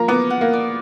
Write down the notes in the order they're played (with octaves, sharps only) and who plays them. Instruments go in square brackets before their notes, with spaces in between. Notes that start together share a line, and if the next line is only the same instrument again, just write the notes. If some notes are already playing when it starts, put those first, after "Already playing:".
Already playing: [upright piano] F3 A#3 [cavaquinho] A#5
[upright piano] B3 [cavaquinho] D6
[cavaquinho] F#5
[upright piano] A#3
[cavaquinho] D5